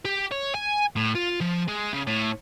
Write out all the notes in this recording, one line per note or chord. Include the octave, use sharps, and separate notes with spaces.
G4
C#5
G#5
A2
F4
F3
G#3
C#3
A2